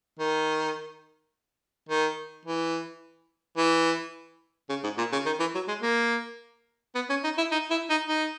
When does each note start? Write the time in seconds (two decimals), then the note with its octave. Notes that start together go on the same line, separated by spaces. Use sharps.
0.19 D#3
1.89 D#3
2.45 E3
3.57 E3
4.69 C#3
4.84 G#2
4.98 A#2
5.12 C#3
5.26 D#3
5.40 E3
5.55 F#3
5.68 G#3
5.82 A#3
6.95 B3
7.10 C#4
7.24 D#4
7.38 E4
7.51 D#4
7.70 E4
7.90 D#4
8.08 D#4